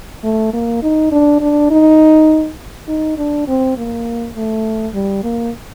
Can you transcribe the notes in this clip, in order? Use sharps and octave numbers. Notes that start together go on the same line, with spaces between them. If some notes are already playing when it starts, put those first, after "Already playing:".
A3
A#3
D#4
D4
D4
D#4
D#4
D4
C4
A#3
A3
G3
A#3